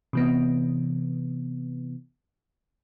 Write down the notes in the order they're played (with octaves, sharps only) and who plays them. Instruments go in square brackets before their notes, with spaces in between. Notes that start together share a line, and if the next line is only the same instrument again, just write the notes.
[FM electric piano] C3 E3 B3